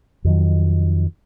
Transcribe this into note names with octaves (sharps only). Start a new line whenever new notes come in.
F2 D#3 F#3